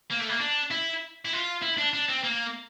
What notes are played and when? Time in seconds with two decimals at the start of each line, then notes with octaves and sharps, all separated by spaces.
0.11 A#3
0.20 A3
0.29 A#3
0.40 D4
0.71 E4
1.25 E4
1.33 F4
1.62 E4
1.78 D4
1.94 D4
2.09 C4
2.24 A#3